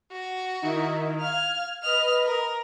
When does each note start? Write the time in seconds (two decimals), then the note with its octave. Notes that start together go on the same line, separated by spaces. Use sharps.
0.12 F#4
0.62 D#3 D#4 E4
1.20 F5 F6 G#6
1.83 B4 D#5 F6
2.26 A#4